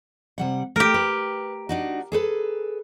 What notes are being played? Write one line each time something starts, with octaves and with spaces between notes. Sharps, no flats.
C3 G3 F#5
A3 G4 A#4
B4
D4 D#4 F#4
G#4 A4 B4